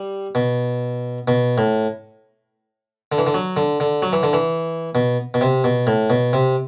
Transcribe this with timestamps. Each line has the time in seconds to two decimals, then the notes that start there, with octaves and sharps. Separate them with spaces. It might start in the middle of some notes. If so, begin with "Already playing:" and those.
Already playing: G3
0.35 B2
1.28 B2
1.58 A2
3.12 D3
3.18 E3
3.27 D3
3.34 F#3
3.57 D3
3.80 D3
4.02 F#3
4.13 E3
4.23 D3
4.33 E3
4.95 B2
5.34 B2
5.41 C3
5.64 B2
5.87 A2
6.10 B2
6.33 C3